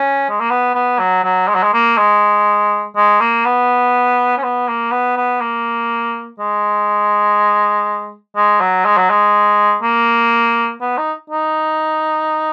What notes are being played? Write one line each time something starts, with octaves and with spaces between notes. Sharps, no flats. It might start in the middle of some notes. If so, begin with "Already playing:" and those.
Already playing: C#4
G#3
A#3
B3
B3
F#3
F#3
G#3
F#3
G#3
A#3
G#3
G#3
A#3
B3
C#4
B3
A#3
B3
B3
A#3
G#3
G#3
F#3
G#3
F#3
G#3
A#3
B3
D#4
D#4